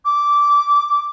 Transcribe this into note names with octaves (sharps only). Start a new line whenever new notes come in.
D6